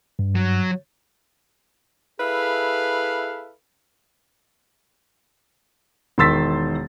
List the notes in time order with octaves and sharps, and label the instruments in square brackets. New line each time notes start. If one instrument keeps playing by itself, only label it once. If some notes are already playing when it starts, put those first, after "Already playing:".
[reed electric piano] G2
[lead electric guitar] F#3
[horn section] E4 G#4 A4 B4 E5 F5
[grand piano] E1 D#3 C6 E6 A6 B6